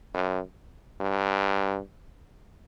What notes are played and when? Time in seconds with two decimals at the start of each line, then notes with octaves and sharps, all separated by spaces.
0.14 F#2
1.00 G2